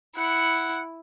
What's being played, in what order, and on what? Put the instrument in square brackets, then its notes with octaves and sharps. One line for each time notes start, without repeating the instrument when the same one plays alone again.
[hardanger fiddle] E4 [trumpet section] F#5